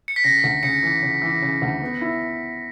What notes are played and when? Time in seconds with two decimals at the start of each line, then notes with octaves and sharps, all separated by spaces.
0.08 C#7
0.16 B6
0.24 C#3 A#6
0.44 D2
0.63 C#3 C#7
0.83 E3
1.02 C#3
1.22 E3
1.42 C#3
1.62 D2
1.82 B3
2.01 E4